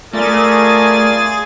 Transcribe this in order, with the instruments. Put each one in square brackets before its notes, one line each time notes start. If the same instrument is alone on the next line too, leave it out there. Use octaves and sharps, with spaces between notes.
[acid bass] A3 [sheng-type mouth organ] F4 D5 [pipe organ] G#4 G#5 A6 [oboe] A#4